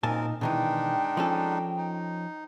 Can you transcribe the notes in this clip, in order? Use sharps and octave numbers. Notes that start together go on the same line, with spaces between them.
F#2 A#2 C4 D#4 A#4 G#5 A5
B2 D#3 E3 G#3 D4 D#4 G5
F3 C#4 A4
D#4